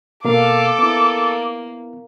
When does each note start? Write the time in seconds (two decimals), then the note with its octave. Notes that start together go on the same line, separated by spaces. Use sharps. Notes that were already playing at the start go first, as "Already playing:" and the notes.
0.25 B2 A#3 A4 F5 D6
0.79 A#3 B3 E4